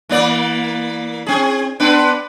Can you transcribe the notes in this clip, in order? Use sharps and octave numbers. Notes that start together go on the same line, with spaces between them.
E3 A#3 D5
C4 G#4
B3 D4 B4